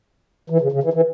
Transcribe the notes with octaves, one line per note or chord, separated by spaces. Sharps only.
E3
C#3
C#3
E3
E3